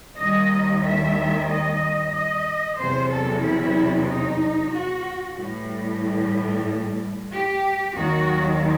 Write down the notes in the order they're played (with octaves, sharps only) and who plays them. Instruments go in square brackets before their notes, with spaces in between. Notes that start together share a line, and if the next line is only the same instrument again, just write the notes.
[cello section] D#2 D#3 G3 D#5
E5
D#5
D#5
E2 C3 F#3 C5
A4
E4
D#4
F#4
A2 E3 G3
G4
D#2 D#3 F#3 F#4